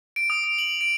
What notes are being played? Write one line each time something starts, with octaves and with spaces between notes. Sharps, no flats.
D7
D#6
D7
F#7
D7